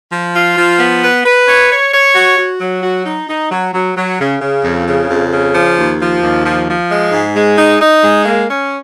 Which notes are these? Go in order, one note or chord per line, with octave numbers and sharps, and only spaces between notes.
F3
F4
F3
B3
B4
B4
C#5
C#5
C#5
F#4
F#4
F#3
F#4
D#4
D#4
F#3
F#3
F#3
C#3
C#3
F2
C#3
F2
C#3
F3
D#2
F3
D#2
F3
F3
G#3
G#2
G#3
D#4
D#4
G#3
A#3
C#4